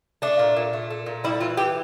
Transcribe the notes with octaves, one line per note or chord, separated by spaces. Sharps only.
A3 D4
A#2
A#2
A3
A3
A#2
G3 E4
E3 F4
E3 G4